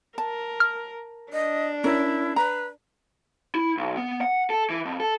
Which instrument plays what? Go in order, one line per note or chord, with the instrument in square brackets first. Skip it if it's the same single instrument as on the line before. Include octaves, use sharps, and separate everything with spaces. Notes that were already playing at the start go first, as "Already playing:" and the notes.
[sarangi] A#4 [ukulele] A5
[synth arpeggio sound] F6
[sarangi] D4 [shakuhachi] D#5
[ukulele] C#4 A#4 [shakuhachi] E4
[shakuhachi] B4 [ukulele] A#5
[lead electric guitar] E4
B1
B3
F#5
A4
E3
F2
A4